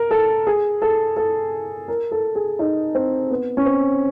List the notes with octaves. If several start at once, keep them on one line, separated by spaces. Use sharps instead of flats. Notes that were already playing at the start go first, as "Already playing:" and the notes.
Already playing: A#4
A4
G#4
A4
A4
A#4
A4
G#4
D#4
C4
B3
C#4
C4